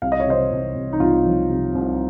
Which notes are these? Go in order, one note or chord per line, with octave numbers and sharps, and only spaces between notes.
C2 F5
D#5
C#5
C3 C5 D#5
C2
C2
D#4
C2 F4
F3
C3
C2